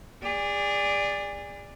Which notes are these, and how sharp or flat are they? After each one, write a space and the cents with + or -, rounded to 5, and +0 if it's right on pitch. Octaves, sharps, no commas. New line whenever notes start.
G#4 -30 D5 +0